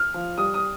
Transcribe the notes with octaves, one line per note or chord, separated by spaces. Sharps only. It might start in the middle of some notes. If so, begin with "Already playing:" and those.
Already playing: F6
F3
G3 D#6
D#6